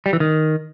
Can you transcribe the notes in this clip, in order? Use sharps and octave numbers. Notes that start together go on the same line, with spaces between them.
G3
E3
D#3